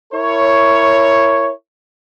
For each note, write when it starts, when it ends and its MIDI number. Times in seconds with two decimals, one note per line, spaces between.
0.13 1.51 64
0.13 1.51 70
0.13 1.51 73